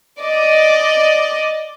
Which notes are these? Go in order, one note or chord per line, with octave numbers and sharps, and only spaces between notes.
D5 D#5